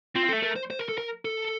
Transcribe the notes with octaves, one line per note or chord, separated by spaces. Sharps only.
C4 F4
A4
A3
A#4
C5
C5
A#4
A4
A#4
A4